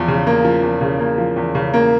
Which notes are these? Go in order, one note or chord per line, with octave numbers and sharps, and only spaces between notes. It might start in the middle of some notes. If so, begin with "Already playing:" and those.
Already playing: E2 F3
C#3
A#3
F3
E2
C#3
A#3
F3
E2
C#3
A#3